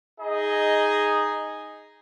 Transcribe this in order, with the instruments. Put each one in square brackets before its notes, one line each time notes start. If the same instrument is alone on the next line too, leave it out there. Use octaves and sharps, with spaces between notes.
[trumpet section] D#4 G#4 D#5